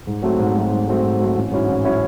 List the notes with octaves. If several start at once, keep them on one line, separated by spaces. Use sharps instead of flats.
G#2
F#3 A3 C4
G#2
F#3 A3 C4
G#2
F#3 A3 C4
G#2
F#3 A3 C4
A1
G#2 F#3 C#4 E4
A1
F#3 C#4 E4